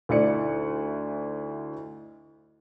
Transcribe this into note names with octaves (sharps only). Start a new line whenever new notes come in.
D2 D#4 E4 D5 C#7